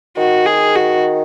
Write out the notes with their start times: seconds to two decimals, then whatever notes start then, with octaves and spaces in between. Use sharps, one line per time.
0.17 D#3 F#4
0.46 G#4
0.75 F#4